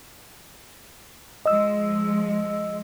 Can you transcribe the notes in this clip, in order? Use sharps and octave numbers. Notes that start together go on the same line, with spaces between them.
F3 G#3 D#5 E6